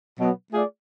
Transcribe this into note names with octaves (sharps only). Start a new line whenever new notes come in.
B2 F#3 B3
A3 F4 G#4 D5